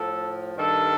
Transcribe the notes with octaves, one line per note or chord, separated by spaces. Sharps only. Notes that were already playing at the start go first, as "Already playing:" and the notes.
Already playing: A2 F3 A4
G2 D#3 G3 A4